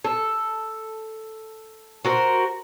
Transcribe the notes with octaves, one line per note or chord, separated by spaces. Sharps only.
A4
F#4 A#4 C5